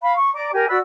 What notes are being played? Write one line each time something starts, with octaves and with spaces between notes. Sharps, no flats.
F5 B5
C#6
D5 A#5 D6
G4 A#4 G#5
F#4 B4 D5 E6